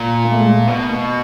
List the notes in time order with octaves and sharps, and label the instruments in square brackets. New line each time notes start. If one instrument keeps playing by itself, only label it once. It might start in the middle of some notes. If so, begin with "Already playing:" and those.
Already playing: [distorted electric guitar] A#2
[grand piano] A#3
A3
G#3
A3
[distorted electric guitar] B2 [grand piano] B3
[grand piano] A#3